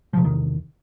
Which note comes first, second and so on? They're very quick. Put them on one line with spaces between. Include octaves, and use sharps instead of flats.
F3 C3 E2 D#3